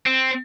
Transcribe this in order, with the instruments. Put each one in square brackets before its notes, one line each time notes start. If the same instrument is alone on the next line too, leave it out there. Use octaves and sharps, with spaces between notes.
[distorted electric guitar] C4